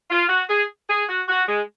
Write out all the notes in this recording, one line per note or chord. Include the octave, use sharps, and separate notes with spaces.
F4
F#4
G#4
G#4
F#4
F#4
G#3